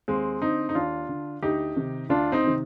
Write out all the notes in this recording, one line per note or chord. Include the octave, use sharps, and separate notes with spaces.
D#2 G#3 C4
D3 C4 D#4
D#4
D#2 D4 F4
D3
D2 D#4 G4
C3 D#3
D2 D4 F4
C4 D#4
C3 D#3